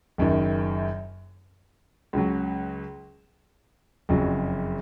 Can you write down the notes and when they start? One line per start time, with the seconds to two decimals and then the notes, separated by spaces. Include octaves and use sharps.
0.18 F#1 F#2 D#3
2.13 C#2 C#3 F#3
4.09 F#1 F2 C#3 F#3